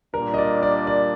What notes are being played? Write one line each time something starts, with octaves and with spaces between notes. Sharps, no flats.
A#2 G3 D4 A#4
D#5
D5
D5
D5